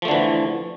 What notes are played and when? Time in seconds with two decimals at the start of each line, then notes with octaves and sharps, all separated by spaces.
0.02 F3
0.05 A3
0.08 D3
0.11 E3